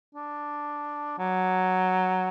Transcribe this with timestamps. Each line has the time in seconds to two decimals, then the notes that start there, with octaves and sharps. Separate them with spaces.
0.15 D4
1.19 F#3